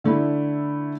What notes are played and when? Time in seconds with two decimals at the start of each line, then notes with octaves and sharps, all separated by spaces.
0.04 D3 A3 D4 E4